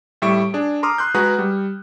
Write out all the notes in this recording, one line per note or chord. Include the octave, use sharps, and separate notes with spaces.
A2 G3 E5 C#6 D7
D4 G#4
A#5 C6 D6 D#6 F6
C6 F#6 G6
G#3 F#4 G#4 B4 A#5 F#6
G3